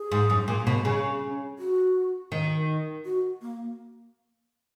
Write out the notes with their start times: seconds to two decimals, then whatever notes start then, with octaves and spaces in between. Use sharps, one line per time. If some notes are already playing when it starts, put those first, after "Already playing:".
Already playing: G#4
0.12 G#2
0.30 F#2
0.48 A#2
0.67 B2
0.85 C#3
1.59 F#4
2.32 D#3
3.05 F#4
3.42 A#3